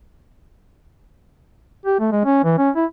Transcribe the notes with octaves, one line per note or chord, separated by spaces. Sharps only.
G4
A3
G#3
C#4
E3
C#4
E4